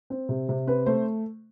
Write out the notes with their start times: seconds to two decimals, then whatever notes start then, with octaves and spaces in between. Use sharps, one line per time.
0.10 C4
0.29 C3
0.49 C3
0.67 C4 B4
0.86 A3 C5